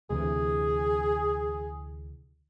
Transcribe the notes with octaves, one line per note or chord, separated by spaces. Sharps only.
D2 C3 E3 G#4